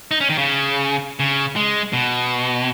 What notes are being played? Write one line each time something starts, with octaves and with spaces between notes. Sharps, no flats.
D#4
C#4
D#3
C#3
C#3
G#3
B2